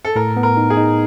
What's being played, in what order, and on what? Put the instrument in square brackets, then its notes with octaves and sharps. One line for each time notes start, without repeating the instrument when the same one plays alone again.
[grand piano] A4
[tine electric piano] A2 [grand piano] A#4
[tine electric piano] B3
[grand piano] A#4
[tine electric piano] D#4
[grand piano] G#4
[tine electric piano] D#4